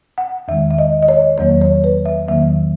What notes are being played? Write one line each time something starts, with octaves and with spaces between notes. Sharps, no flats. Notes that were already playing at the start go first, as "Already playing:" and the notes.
F#5
E2 D#3 G#3 E5
E5
D#5
D#5
C#5
E2 D#3 F#3 A#3 C#5
C#5
B4
E5
E2 D#3 F#3 A#3 E5